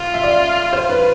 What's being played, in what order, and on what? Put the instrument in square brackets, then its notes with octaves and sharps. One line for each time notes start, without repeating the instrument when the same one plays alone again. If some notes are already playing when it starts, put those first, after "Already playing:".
Already playing: [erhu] F4
[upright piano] E5
D5
C5
B4